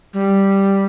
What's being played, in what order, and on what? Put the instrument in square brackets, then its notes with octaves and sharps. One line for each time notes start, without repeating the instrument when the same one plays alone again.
[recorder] G3